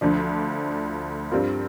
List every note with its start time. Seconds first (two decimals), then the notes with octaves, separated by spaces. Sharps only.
0.01 D2 D3 F3 D4
1.31 G2 G3 C4 F4 A#4